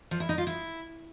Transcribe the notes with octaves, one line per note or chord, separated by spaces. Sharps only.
F3
E4
D#4
F4
E4